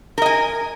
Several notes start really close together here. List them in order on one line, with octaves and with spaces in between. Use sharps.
A#4 D#5 G#5